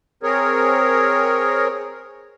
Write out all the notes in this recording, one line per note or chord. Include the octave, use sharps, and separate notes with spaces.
C4 G#4 A#4 C#5